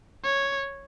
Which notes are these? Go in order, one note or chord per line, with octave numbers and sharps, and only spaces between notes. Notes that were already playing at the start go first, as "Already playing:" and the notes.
C#5